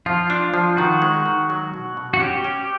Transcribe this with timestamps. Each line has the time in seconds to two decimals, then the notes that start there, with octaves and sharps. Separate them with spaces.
0.06 F3 F4
0.30 D4
0.54 F3
0.77 D#3 F#4
1.02 G#3
1.25 D#3
1.50 F#3
1.74 B2
1.97 B2
2.14 F#4
2.20 C#4 G4
2.44 C#4